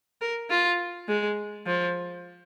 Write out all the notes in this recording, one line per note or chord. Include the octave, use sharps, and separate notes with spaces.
A#4
F4
G#3
F3